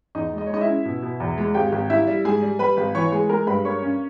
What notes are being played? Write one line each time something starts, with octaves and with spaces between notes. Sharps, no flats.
E2 D#4 D#5
G#3 D#5
C#5
G#3 D#4 D#5
E4 E5
C#4
B2
B2
E2
G#3
G#1 G4 G5
G#1
G3 E4 E5
G3
G#2 G#4 G#5
G3
G3 B4 B5
G#1
E3 C#5 C#6
G#3 G#4 G#5
G#3 A#4 A#5
G2 B4 B5
A#3 C#5 C#6
C#4